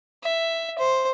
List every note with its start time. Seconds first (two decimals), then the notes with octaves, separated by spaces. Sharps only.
0.24 E5
0.79 C5